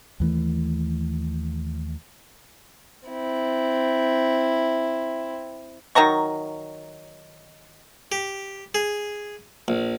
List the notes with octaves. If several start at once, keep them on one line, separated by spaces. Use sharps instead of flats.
D#2 E3 A3
C4 E4
D#3 F#3 A#5 C#6
G4
G#4
A#1